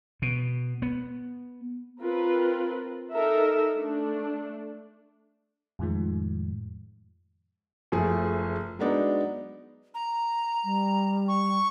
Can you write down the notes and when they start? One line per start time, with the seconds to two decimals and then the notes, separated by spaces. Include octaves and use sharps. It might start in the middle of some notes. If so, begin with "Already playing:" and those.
0.22 B2
0.82 B3
2.01 C4 F4 A#4 B4
3.13 D#4 A4 A#4 E5
3.75 A3 D4
5.79 F2 A2 D#3 F3 G#3
7.92 F#1 F3 A3 G#4
8.79 F#3 G#3 B3 D4 D#4
9.94 A#5
10.65 G3
11.28 C#6